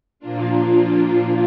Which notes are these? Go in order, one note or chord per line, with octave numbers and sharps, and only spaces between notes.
A#2 F3 A#3 D4 F4